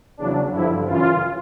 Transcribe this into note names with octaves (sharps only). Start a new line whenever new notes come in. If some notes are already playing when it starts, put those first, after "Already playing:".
E2 C#3 F#3 D4
G2 D3 F3 E4
F#2 C#3 E3 F4